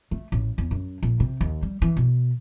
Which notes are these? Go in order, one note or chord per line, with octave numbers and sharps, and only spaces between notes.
A3
A1
E2
F#2
A#1
C3
D#2
G3
E3
B2